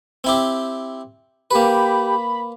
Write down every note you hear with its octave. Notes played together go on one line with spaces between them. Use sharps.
C4 E4 G4
A#3 G4 B4 B5